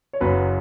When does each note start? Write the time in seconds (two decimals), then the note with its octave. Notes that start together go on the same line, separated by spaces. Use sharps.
0.13 C#5
0.20 F#1 F#2 F#3 B4